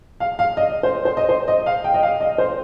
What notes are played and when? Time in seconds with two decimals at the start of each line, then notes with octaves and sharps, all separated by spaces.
0.20 F5
0.39 F5
0.57 D#5
0.83 C5
1.05 C5
1.17 D#5
1.29 C5
1.48 D#5
1.66 F5
1.84 G5
1.94 D#5
2.03 F5
2.20 D#5
2.38 C5